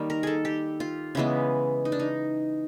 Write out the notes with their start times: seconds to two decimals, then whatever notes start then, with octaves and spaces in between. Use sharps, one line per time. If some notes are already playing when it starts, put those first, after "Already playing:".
Already playing: D#3 G3 A#3
0.10 A#4
0.23 G#4 A4
0.45 G4
0.80 F4
1.15 C#3 E3 G#3 B3
1.85 D#4
1.92 D4
1.99 D#4